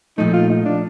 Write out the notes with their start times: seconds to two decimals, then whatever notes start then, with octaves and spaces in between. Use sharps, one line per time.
0.18 A#2 F3 A3 D#4
0.33 F4
0.50 D#4
0.65 D4